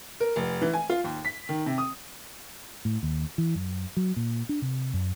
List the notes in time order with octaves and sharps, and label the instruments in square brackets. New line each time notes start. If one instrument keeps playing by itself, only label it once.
[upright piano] A#4
F1
E3
G#5
F4
D#2
B6
D#3
C3
D#6
[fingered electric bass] A2
D#2
E3
F#2
F#3
A#2
D4
C3
F#2